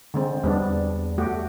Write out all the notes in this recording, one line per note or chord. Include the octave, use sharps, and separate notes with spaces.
D3 G#3 C4
E2 G3 B3 D4
A3 F#4 G4